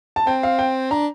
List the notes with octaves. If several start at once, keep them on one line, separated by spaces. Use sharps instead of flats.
A5
C4 G5
F5
G5
D4 A#5